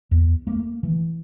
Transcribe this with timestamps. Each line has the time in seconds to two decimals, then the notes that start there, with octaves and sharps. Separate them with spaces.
0.11 E2
0.47 A3 A#3
0.83 E3